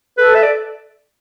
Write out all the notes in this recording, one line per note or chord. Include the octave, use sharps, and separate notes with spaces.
A4 B4
E5
D5